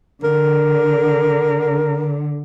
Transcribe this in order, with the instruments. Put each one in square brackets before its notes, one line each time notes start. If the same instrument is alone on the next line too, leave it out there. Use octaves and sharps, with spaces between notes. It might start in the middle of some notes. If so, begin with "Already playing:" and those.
[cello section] D3 [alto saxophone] A#4